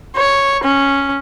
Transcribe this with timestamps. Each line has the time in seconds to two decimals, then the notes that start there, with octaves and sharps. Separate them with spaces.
0.16 C#5
0.64 C#4